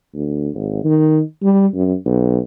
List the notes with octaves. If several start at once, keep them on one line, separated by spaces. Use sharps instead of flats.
D2
G#1
D#3
G3
F#2
B1